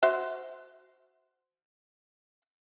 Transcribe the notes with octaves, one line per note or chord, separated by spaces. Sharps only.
F#4 C5 E5